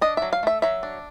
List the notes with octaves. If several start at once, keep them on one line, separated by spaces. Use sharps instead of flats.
D4 D#5
F#3 E5
F5
A3 E5
F#3 E5
D4